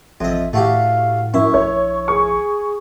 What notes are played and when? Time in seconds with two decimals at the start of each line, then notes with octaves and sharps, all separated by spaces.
0.21 A1 F2 D#5 E5
0.53 A2 A3 F#4 G4 F5
1.34 F#2 E4 C#6
1.54 A#1 C#5
2.08 G#4 C#6